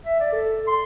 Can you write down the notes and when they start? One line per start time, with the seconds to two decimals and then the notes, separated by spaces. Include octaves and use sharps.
0.05 E5
0.20 D5
0.33 A4
0.67 C6